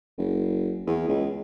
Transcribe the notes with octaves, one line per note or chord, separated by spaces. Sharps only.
F#1
E2
C#2